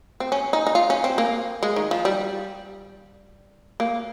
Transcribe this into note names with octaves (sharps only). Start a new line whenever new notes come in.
C4
C#4
D#4
D#4
F4
C#4
C4
A#3
G#3
D#3
F3
G3
A#3